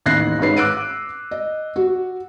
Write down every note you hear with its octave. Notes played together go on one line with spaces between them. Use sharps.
A1 D#2 F#6 A#6 C7
G#1 G#2 C#4 B4 C7
D6 E6 F#6 D7 D#7
D#5
F#4